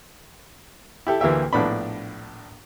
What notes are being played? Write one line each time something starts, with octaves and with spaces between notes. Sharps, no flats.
E4 G4 A4
D2 E3 A#3 G4 E5 G5
A#1 A2 B3 D4 B5